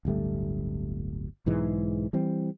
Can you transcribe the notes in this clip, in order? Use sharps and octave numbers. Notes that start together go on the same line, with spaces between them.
D1 G1 G3 A3
B1 G#2 E3 G#3
E3 G3 C4